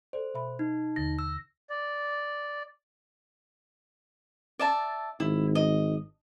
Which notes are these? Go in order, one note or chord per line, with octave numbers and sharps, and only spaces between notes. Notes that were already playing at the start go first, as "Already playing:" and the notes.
A4 C5 D5
B2 E5 B5
D#4
D#2 D3 A6 A#6
E6
D5
D5 E5 A5
G#1 E4
D#5